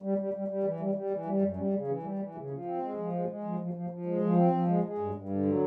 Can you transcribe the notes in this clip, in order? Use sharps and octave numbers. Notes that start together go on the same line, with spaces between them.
G3
G3
G3
G3
E3
G3
G3
E3
G3
F#2
G3
C#3
E3
G3
E3
C#3
F3
C4
G#3
F3
G#3
G#3
F3
F3
F3
F3
G#3
F3
C4
F3
G#3
G#3
G2
G2
D3
F#3